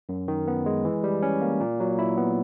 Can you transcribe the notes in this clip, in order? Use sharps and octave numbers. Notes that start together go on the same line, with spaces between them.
F#2
D#3
B3
G#3
E3
G3
C#4
A#3
A#2
F#3
E4
B3